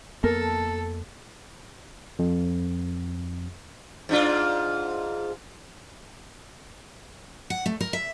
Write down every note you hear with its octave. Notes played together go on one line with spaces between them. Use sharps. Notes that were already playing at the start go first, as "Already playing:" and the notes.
F2 A#3 B3 A4 A#4 A5
F2
G#2 D4 F4
F#5
A3
A#4
E5